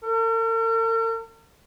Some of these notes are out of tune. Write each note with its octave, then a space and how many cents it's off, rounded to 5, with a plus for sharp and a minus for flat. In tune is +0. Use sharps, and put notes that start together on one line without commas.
A#4 -45